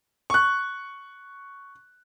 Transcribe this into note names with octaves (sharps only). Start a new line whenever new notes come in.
C#6 F#6